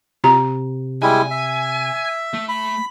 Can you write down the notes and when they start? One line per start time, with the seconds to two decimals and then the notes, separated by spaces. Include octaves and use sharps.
0.24 C3 F4 A#5
1.02 G3 G#3 E4 G#5
1.31 E5
2.34 A3
2.48 B5